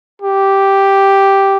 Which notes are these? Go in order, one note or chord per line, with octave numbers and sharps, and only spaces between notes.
G4